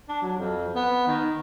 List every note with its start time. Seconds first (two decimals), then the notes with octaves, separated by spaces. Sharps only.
0.09 D4
0.22 F#3
0.39 F2
0.75 B3
1.07 D#3